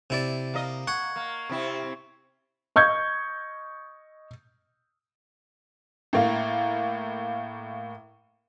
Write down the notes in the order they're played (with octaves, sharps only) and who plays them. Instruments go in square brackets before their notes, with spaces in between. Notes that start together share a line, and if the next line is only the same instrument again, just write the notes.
[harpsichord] C3 E4 D5
[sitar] A#3 D#5
[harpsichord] F#5 [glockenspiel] C#6 G#6
[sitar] A#3
C3 C4 E4
[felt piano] D#5 C#6 G6 G#6
[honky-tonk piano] A2 A#3